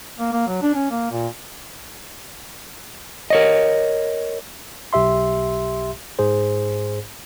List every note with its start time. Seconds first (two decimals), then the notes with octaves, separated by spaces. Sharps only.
0.19 A#3
0.33 A#3
0.48 F#3
0.62 D4
0.75 C#4
0.91 A#3
1.11 A#2
3.30 A#4 C#5 D#5
4.93 B1 G4 E5 C6
6.19 G#2 G#4 C5